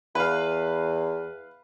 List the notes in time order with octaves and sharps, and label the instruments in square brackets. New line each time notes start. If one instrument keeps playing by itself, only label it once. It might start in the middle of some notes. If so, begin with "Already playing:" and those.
[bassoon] E2 [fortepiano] B4 F5